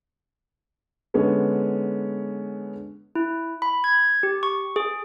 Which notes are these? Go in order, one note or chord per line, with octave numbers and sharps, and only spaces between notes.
D3 G#3 B3 C#4
E4
B5
G#6
G4
C#6
G#4